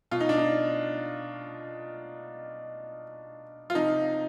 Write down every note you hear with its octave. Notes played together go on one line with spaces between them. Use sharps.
B2 F4
D#4
D4
D#4
F4
C3 F3 D#4